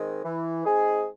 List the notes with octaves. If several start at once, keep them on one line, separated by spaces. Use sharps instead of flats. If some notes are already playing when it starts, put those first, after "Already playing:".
Already playing: D#3 G#3 C4
E3
G#3 C4 D#4 G#4